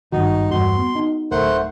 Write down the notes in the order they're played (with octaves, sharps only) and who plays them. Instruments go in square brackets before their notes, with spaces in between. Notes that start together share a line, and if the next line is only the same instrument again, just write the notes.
[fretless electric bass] G#1 G2 D#3 [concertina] D#4 [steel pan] F#4
[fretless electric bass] E2 G2 [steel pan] F#4 [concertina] C6
[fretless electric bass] B3
[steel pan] D#4
[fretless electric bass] D1 [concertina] A3 C5 F#5 [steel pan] A#4